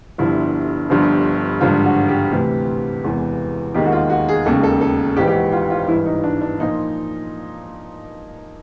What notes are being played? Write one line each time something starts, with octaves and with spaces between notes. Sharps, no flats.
G1 G2 D3 F3 E4
G1 G2 D3 F3
G#1 G2 D3 F3 F4
F#4
G4
D2 C3 E3
E1 E2 C3 E3
E1 D#2 D#3 G4
F#4
F4
F#4
G#4
E1 D#2 C#3 A4
A4
A4
A#1 G#2 E3 G4
G4
F#4
F4
F4
G#1 G2 E3 E4
D#4
D4
D4
A#2 F3 D#4